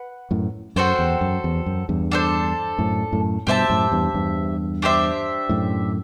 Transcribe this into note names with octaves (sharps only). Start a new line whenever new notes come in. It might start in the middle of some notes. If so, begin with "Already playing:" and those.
Already playing: B4 F#5
F#2 A2
F#2 F#4 A4 C5 G5
E2
F#2
E2
F#2
E2 G2
D4 A4 C5
F#2 A2
F#2 A2
G2 B2 G4 C5 E5 A5
F#2 A2
E2 G2
E2 G2
D4 G4 C5 E5
F#2 A2